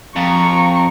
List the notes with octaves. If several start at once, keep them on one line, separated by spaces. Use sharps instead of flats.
F2 A#5 C#6